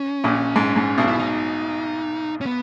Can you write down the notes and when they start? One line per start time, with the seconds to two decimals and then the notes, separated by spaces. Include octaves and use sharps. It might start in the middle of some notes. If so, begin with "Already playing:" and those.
Already playing: C#4
0.24 A#1 A#2
0.56 G#2
0.76 G#2
0.98 B1 B2
1.07 E4
1.19 D#4
2.41 C#4
2.46 B3